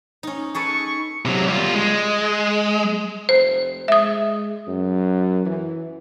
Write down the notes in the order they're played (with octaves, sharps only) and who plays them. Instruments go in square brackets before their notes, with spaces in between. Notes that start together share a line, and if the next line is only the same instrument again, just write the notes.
[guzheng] C#4 D#4
[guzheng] G#4 A4 B4 [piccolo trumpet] C#6
[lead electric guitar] C3 F#3
G3 F4
G#3
[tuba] F1 [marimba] C5
[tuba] G#3 [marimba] E5 D#6
[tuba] F#2
E3